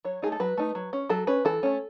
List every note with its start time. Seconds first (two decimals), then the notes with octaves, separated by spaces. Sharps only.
0.05 F#3 C#5
0.22 A3 D#4 G#4
0.32 A4
0.40 F#3 B4
0.57 A3 D#4
0.75 F#3
0.93 C#4
1.09 F#3 A4
1.27 C#4 B4
1.45 E3 A4
1.63 A3 C#4